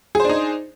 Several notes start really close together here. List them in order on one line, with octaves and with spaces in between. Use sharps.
G#4 C5 D4 D#4